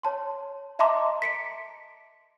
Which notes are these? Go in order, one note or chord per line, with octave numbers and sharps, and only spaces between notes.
C#5 A5 C6
D#5 E5 A5 A#5 C6 D6
B6 C#7 D7